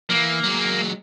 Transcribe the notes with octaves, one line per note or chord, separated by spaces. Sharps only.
E3 F3 A#3
F#3 G#3